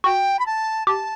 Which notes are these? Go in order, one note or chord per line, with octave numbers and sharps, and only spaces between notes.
F#4 G5
B5
A5
G4 A5